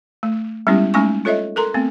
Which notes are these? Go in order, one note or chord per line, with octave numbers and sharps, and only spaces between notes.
A3
G3 G#3 B3 C#4 E4 G4
G#3 A3 C#4 D#4 G#5 C#6
F4 A4 C#5 D#5 E5
A4 A#4 A#5 C6
A3 B3 C4